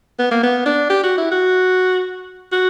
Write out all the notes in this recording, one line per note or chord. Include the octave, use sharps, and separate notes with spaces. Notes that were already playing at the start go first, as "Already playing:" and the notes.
B3
A#3
B3
D4
G4
F#4
E4
F#4
F#4